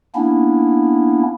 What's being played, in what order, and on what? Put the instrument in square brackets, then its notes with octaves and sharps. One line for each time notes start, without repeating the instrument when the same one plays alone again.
[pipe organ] A#3 B3 C#4 D4 E4